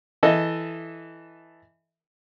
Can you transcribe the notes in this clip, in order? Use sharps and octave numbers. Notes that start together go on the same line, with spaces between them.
E3 A4 D#5 E5